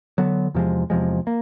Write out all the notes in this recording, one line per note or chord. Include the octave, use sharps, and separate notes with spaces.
D3 F#3 B3
E2 C3 F3 G#3
E2 C3 F3 G#3
A#3